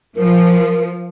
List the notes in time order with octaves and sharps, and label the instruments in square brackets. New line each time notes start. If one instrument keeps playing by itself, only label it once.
[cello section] F3 [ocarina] A#4